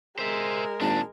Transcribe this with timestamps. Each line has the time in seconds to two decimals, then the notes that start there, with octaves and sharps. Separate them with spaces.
0.19 G#3 A#4 C5 E5
0.81 G#1 A#2 D4 A5